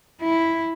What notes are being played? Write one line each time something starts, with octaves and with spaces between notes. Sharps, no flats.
E4